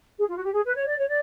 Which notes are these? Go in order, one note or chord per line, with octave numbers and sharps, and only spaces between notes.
G#4
F4
F#4
G4
G#4
B4
C#5
D5
C#5
D5